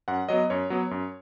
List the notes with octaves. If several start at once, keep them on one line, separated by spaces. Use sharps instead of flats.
F#2 F#5
F#3 B3 D#5
F#2 C#5
F#3 B3
F#2